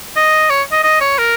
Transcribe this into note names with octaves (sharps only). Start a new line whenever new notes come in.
D#5
C#5
D#5
D#5
C#5
A#4